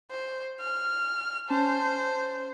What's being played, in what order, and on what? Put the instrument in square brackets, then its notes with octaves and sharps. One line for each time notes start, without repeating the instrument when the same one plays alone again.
[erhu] C5
F6
[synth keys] C#4 A5 [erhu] C5